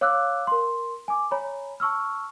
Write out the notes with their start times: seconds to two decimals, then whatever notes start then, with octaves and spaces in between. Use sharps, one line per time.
0.01 C#5 F5 D6 E6 F#6
0.47 A#4 C6
1.08 G#5 D6
1.31 C#5 G#5 A#5 B5
1.80 A5 C#6 E6 F6